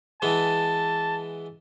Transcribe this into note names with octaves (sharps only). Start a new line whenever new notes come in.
E3 G#3 B3 A5